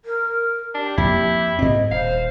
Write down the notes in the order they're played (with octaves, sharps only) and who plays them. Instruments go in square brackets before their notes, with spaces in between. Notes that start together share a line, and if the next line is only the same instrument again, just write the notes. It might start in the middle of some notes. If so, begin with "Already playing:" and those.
[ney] A#4
[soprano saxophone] D4 [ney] G4
[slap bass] F2 A#3 [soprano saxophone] E4
[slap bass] G#2 C4 [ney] D#5
[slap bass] D#1 [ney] C5 [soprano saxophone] F5